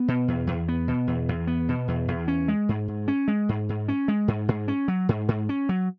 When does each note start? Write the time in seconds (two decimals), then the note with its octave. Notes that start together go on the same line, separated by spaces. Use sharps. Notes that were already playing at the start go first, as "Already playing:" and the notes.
Already playing: B3
0.08 B2
0.28 E2
0.47 E2
0.68 B3
0.88 B2
1.07 E2
1.29 E2
1.47 B3
1.69 B2
1.88 E2
2.08 E2
2.28 C#4
2.48 G#3
2.69 G#2
2.88 G#2
3.08 C#4
3.28 G#3
3.49 G#2
3.69 G#2
3.88 C#4
4.08 G#3
4.28 G#2
4.49 G#2
4.68 C#4
4.88 F#3
5.09 G#2
5.28 G#2
5.49 C#4
5.69 F#3